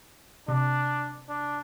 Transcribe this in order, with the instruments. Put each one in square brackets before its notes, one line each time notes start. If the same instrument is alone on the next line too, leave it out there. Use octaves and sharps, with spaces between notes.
[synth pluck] C3 [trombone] D4
[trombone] D4